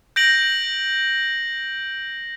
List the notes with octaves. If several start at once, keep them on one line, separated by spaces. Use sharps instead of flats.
G6 A#6 D7 F#7